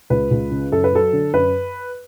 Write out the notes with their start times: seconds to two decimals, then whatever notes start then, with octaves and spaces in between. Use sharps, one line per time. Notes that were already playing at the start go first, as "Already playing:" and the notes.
0.10 C#2 B4
0.31 C#2
0.51 C#3
0.72 F#2 A4
0.84 B4
0.93 F#3 A4
1.13 D3
1.34 F#2 B4